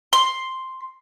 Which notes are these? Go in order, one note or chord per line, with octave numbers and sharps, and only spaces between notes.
C6